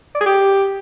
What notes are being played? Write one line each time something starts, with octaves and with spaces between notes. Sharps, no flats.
D5
G#4
G4